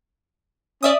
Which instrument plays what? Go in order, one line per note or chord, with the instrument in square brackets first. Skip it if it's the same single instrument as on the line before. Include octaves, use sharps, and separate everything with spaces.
[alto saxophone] C#4 [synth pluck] D5 E5 D#6